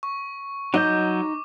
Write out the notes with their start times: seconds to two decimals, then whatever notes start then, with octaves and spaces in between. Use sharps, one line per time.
0.03 C#6
0.74 F#3 D#4 D#5 D6 G6